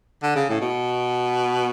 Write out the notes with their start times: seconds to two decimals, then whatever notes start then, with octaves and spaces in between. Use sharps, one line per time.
0.23 D3
0.35 C#3
0.49 A2
0.61 B2